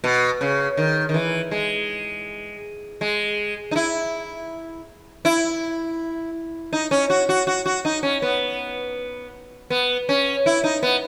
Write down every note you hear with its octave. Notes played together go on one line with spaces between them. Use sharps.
B2
C#3
D#3
D#3
E3
G#3
G#3
D#4
E4
E4
D#4
C#4
F#4
F#4
F#4
F#4
D#4
C#4
B3
B3
C#4
E4
D#4
B3